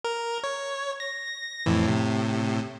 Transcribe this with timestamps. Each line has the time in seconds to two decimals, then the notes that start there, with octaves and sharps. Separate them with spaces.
0.04 A#4
0.44 C#5
1.00 A#6
1.66 F2 A2 E3
1.87 A2 C3